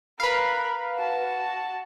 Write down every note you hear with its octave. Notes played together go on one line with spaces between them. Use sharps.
A#4 B4 F5 B5
F#4 A5